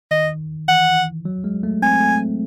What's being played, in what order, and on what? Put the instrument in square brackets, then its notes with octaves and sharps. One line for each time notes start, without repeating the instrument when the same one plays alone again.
[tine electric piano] D#3 [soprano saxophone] D#5
[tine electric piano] E3 [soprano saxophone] F#5
[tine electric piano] F#3
G#3
A3
[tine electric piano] C4 [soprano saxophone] G#5
[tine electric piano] A3